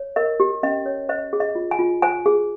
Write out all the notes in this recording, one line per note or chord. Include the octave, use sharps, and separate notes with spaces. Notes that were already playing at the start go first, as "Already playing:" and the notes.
Already playing: C#5
A#4 D#5
G4
C#4 D#5
C#5
C5 D#5
G#4
D#5
F4
G#5
F4
C5 G#5
G#4